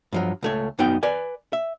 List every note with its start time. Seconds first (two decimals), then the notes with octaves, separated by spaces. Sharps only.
0.12 G2 F3 F#3
0.43 C#2 A3 C#5
0.79 F#2 B3 D#4 F#4 G5
1.03 B4 D5 G#5
1.53 E5